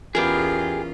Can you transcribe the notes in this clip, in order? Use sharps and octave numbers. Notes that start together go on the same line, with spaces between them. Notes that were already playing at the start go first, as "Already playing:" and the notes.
E2 B3 C#4 F4 G4 G#4 A#4